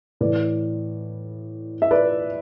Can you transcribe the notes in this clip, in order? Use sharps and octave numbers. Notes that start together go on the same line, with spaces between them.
A2 E3 B4 D5
E5
B4 D5